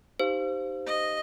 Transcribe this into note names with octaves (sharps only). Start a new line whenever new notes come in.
D#4 G4 C5 F5
D#5